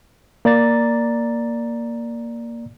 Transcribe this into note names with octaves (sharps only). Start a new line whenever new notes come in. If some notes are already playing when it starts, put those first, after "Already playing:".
A#3 D5 A#5 A6